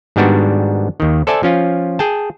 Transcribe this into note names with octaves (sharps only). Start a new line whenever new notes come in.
G#2 D#3 G3 B3 D4 F#4
D#2 D#3
A4 C5 D5 E5 G#5 A5
F3 C#4 F4
G#4 G5 A5